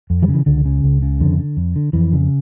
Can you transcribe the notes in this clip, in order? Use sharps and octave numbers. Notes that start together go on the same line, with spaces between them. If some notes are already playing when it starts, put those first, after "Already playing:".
F2
E3 G3
C#3
E3
C#2 D3
C#3
C#2
C#3
F2 D3
D3
F2
D3
F2 E3
C#3